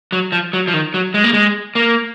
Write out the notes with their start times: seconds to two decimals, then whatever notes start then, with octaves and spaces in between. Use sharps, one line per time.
0.12 F#3
0.32 F3
0.53 F#3
0.68 F3
0.74 D#3
0.94 F#3
1.14 G#3
1.24 A#3
1.33 G#3
1.75 A#3